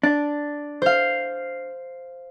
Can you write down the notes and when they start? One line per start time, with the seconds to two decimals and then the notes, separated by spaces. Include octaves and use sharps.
0.03 D4
0.82 C5 F5